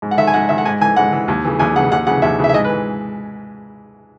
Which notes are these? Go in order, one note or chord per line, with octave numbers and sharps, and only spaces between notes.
G#2
F#5
D#3 E5
G#5
G#2 F#5
D#3 E5
F#5
G#2 G#5
E3 G#5
G#2 F#5
E3
D#2
C#3 E3
D#2 G#5
C#3 E3 F#5
D#2 F#5
C#3 E3 F#5
D#2 E5
C#3 E3 E5
E5
G#2 D#5
B4
E3